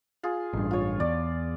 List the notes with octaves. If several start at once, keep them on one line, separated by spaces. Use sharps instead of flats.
F4 G#4
A1 G2
F4 C#5
E2 D5